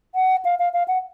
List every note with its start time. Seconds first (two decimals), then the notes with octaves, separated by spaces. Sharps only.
0.15 F#5
0.45 F5
0.59 F5
0.74 F5
0.88 F#5